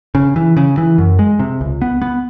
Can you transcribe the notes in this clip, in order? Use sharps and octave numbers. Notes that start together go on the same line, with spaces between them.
C#3
E3
C#3
E3
F#2
G#3
C3
C#2
B3
B3